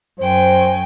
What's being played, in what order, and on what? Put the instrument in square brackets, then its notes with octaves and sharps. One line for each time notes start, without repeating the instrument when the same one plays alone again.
[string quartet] F#2 G5 G#5 [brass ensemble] C5